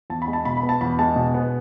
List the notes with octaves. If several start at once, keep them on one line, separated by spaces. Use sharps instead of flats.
E2 A5
B5
G#3
A5
B2 B5
B5
B3
A5
E2 B5
G#3 A5
B2
B3